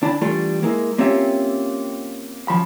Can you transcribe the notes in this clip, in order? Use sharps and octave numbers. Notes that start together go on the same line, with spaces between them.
D2 D4 E4 D5 A5
E3 G3 A3 D4 F4 A4
G#3 A#3 E4
A#3 C4 C#4 F4 G4 E5
F#2 F3 B5